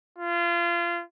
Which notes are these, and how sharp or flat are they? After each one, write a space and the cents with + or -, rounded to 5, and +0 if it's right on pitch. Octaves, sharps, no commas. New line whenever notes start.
F4 -25